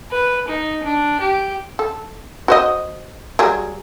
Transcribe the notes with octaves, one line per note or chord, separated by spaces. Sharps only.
B4
D#4
D4
G4
A4
F#4 C5 D#5
F#3 G3 G#4